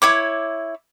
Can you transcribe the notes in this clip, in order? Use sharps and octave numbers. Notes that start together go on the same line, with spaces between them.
E4 C#5 D6